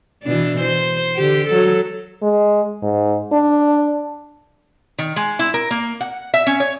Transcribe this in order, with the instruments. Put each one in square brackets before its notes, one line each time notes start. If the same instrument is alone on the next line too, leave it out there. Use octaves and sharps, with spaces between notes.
[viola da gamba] B2 E3 D4
C5
D3 G4
F#3 A4
[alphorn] G#3
G#2
D4
[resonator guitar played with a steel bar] D#3
G#3
E4
A#4
A#3
F#5
E5
C#4
C#5